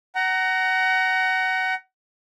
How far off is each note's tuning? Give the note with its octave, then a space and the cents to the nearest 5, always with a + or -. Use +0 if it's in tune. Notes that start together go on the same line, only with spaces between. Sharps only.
F#5 +25 A#5 +0